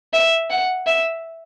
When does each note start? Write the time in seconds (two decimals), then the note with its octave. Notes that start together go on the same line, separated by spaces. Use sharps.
0.13 E5
0.50 F#5
0.87 E5